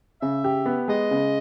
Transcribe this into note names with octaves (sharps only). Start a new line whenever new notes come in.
C#3 E5
G4
B3
G#3 D#5
C#3